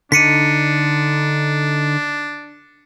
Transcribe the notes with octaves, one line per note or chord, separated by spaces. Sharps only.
D3 D4 D#4 B6 C#7 D#7